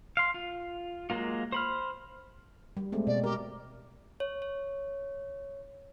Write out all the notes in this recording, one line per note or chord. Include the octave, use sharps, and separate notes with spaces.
F5 C6
F4
F#3 G#3 A#3 F4
C5 B5 F6
G3
G#3 A3 C4
B2 D5
G4 A#4
C#5
C#5